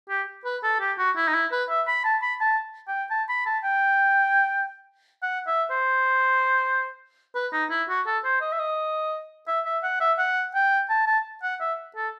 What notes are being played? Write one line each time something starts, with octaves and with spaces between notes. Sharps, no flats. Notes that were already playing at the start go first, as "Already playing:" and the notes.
G4
B4
A4
G4
F#4
E4
D#4
E4
B4
E5
B5
A5
B5
A5
G5
A5
B5
A5
G5
F#5
E5
C5
B4
D#4
E4
F#4
A4
C5
D#5
E5
D#5
E5
E5
F#5
E5
F#5
G5
A5
A5
F#5
E5
A4